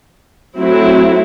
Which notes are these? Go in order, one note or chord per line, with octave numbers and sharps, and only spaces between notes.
F#3 A3 C4 E4